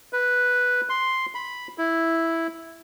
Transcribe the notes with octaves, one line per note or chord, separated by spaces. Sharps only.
B4
C6
B5
E4